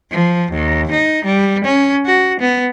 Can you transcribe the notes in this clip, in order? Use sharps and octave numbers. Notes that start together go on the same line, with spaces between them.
F3
D#2
D#4
G3
C#4
F#4
B3